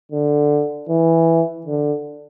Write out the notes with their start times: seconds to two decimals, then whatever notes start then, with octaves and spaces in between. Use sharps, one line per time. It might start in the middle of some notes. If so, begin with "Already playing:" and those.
0.12 D3
0.89 E3
1.66 D3